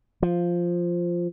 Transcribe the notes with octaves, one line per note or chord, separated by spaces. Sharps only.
F3